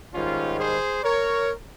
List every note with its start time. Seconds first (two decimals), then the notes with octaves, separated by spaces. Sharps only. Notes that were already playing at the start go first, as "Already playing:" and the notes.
0.14 G#2 D#3 G3 C#4 F4
0.59 G#4 C5
1.04 A#4 C#5